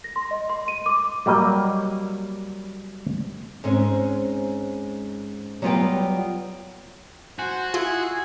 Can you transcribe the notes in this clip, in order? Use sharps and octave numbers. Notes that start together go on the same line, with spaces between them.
A#6
C6
D#5
C6
D#7
D6
F#3 G3 A#3 D#5
G#2 G#3 C4 C#4
F#3 G3 B3 F4 B4 G5
F#4 C5 G#5
E4 F4 G#4